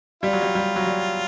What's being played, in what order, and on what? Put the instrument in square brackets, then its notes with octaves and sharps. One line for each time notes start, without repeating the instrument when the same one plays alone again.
[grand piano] G3 [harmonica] F4
[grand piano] F#3
G3
G3
F#3
G3